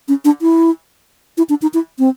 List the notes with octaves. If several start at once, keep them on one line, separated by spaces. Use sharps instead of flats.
C#4
D4
E4
E4
D4
D#4
E4
C4